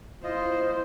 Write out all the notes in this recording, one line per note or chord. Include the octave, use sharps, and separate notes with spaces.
E4 F4 C5 D#5